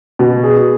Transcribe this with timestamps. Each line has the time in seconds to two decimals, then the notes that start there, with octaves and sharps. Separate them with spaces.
0.19 B2
0.43 G#4